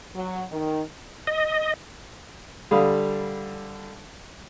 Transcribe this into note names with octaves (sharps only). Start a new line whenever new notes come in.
F#3
D#3
D#5
D3 G3 F5 B5 D#6